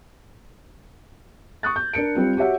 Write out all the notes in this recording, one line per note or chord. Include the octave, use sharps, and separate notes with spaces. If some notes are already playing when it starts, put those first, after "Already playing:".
C#6 D#6 F#6 A6
G6
D4 A#4 C#7 D7
G3 C4 F4
F#4 G4 C#5 E5 F#5